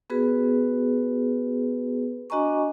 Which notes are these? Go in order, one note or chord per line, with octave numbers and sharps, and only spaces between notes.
B3 F#4 G#4 B4
D4 F#4 D#5 G#5 A#5 C#6